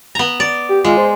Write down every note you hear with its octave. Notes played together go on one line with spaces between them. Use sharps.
B3 A#5
D5
G4
G#3 F4
C5